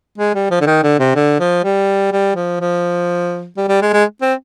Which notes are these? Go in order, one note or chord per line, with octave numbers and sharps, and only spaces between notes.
G#3
G3
F3
D3
D#3
D3
C3
D3
F3
G3
G3
F3
F3
G3
G3
G#3
G#3
C4